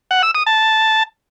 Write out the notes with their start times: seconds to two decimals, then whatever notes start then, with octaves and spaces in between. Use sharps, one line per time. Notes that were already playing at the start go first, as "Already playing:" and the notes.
0.11 F#5
0.23 E6
0.35 D#6
0.47 A5